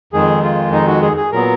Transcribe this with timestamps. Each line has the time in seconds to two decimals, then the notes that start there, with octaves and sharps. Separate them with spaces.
0.13 F2 D#3 G#3 G#4
0.43 F4
0.73 D#4
0.87 F#4
1.02 G#4
1.17 G#4
1.32 A#2 F#3 B3 A#4